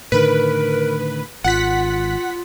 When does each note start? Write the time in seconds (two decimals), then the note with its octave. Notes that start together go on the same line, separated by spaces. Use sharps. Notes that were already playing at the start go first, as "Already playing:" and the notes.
0.12 A2 D3 D#3 A#4 B4
1.44 G#1 F4 F#5 B6